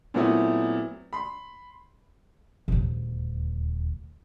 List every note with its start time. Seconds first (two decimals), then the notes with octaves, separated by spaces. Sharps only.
0.14 A#2 F#3 A3 B3 C4 E4
1.13 B5 C6
2.68 D#1 D2